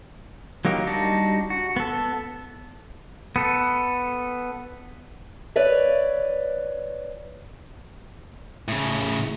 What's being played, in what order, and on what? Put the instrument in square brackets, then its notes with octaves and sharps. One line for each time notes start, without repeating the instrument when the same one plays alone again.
[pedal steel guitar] F#3 A#3 D#4 G4
G3 D4 D#4 F#4
F#4
B3 A4
B3 A4
[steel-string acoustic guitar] B4 C#5 D5 E5
[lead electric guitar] A2 C#3